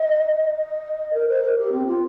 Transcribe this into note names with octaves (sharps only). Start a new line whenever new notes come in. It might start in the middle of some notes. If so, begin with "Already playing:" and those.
Already playing: D#5
D#5
A#4
C5
A#4
G4
C4
F4